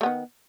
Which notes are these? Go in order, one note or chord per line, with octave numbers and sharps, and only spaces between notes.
D#3 A3 B3